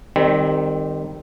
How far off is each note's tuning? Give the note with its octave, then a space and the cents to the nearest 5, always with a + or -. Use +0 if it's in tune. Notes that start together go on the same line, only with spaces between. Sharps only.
D#3 -15 G3 +25 C4 +0